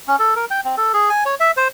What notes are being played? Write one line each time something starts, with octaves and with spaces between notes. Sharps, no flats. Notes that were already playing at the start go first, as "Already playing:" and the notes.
C#4
A4
A#4
G5
C4
A4
G#4
G#5
C#5
E5
C5